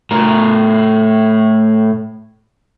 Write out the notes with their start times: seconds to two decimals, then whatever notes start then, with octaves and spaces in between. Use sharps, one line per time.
0.11 A2 A#4